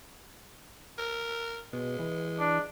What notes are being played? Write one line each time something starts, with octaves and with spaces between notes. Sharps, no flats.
A#4
B2 G#3
E3
D4